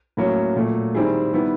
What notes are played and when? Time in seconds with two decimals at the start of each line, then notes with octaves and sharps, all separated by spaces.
0.17 A2 F#3 A#3 C#4
0.56 A#2 F#3 A3
0.94 D#3 G3 C4 E4 G#4
1.34 D#3 G3 B3 E4